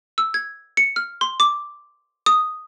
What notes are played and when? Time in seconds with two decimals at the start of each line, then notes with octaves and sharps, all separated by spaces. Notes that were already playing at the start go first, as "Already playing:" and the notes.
0.18 E6
0.34 G#6
0.77 C#7
0.96 F6
1.21 C6
1.40 D6
2.26 D#6